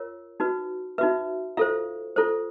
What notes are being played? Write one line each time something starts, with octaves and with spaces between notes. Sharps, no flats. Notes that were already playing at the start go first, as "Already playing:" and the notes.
Already playing: F4 A#4 C#5
D#4 F#4 B4
D#4 F#4 B4 E5
F4 A4 C5 F5
F4 A4 C5